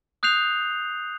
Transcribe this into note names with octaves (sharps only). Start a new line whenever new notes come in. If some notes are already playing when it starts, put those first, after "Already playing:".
D#6 F#6 G6 C7 F7